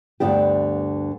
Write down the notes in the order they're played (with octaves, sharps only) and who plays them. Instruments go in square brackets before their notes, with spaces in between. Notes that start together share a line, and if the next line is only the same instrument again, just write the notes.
[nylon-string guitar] D2 G2 D3 B3 D4 G4